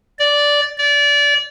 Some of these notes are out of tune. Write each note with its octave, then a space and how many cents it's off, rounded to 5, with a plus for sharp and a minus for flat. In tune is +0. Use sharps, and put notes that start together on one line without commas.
D5 -10
D5 -25